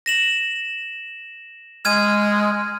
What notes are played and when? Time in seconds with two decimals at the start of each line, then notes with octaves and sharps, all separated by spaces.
0.06 A#6 E7 F#7
1.85 G#3 F6 G#6 D#7